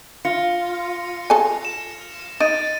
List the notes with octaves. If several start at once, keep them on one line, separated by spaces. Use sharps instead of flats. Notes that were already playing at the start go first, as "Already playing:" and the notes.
F4 A#6 C#7
A4 G#5
E7
D#4 A6 D7 D#7